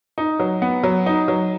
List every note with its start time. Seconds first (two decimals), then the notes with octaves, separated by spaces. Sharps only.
0.18 D#4
0.40 F#3
0.62 B3
0.84 F#3
1.06 D#4
1.28 F#3